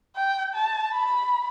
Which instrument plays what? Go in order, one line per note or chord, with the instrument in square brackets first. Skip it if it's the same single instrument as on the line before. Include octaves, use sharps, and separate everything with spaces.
[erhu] G5
A5
B5